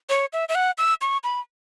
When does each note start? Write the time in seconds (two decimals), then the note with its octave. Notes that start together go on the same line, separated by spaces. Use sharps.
0.09 C#5
0.33 E5
0.49 E5
0.55 F#5
0.78 E6
1.01 C#6
1.24 B5